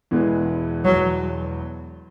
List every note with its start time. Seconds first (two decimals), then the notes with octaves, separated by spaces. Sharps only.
0.11 E1 E2 E3 G#3 B3
0.84 F#3